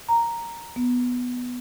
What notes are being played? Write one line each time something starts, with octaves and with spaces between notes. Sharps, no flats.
A#5
B3